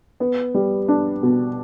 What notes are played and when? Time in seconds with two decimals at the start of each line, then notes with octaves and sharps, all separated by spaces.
0.20 B3
0.54 G3
0.88 D4
1.23 B2